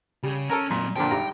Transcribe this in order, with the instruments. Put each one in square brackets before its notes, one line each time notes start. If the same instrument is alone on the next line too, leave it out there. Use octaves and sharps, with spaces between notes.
[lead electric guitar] C#3 [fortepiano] G3
[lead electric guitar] C#4 C#5 [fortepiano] A4 A#4 A#5
[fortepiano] A#2 [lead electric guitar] F#3 C4
[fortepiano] A#2 D3 F3 [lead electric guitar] G5
[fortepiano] G#1 G3 A#5